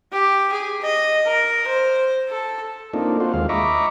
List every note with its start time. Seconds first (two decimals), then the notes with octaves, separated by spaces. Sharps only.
0.13 G4
0.52 G#4
0.81 D#5
1.26 A#4
1.67 C5
2.29 A4
2.93 A#3 C4 D4 D#4 F4 A4
3.20 F4 F#4 C5
3.34 D#2 G#3 F5
3.49 D#5 E5 A#5 B5 C#6 D6